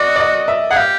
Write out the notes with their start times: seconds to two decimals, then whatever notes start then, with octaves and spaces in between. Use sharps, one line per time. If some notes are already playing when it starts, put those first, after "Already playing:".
Already playing: F#4 D5 D#5
0.16 D5
0.20 D#5
0.48 E5
0.71 G#4 F#5
0.76 G4 F5